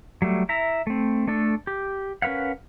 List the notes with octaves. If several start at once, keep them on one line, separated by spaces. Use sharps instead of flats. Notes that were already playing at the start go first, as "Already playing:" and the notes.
F#3 G3 A3
E4 E5 A#5
A3 C4
A3 D4 A4
G4
C#4 A#4 B4 F5 F#5